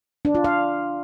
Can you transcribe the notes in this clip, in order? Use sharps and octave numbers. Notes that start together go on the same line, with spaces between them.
D4
F4
F5